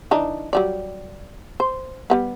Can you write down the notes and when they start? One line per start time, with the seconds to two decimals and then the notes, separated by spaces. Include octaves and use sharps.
0.11 E3 D4 D#4
0.53 F#3 G3 D5
1.60 C5
2.10 G3 A3 B3